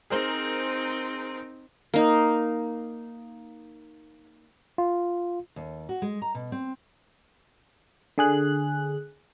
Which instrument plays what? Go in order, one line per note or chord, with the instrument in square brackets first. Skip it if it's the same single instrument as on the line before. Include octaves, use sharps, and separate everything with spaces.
[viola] C4 D#4 [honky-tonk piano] G#4 A#4 C5
[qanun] A#3 D#4
[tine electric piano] F4
[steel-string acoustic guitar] D#2
F#4
G#3
A#5
B2
C4
[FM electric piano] D3 G#4 F#6